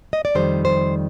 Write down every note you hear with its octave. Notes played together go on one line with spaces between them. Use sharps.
D#5
D5
F2 D#3 G3 C5
C5